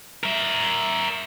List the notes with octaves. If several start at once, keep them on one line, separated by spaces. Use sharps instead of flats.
A#4 E5